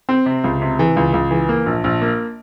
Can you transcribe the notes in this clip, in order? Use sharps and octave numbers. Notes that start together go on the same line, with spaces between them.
C4
C3
C#2
C3
E3
C#2
C#2
E3
A#3
A#1
A#1
A#3